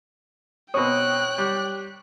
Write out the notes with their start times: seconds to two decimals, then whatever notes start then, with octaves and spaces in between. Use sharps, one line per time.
0.74 B2 C4 C#5 G5 D#6 F#6
1.38 G3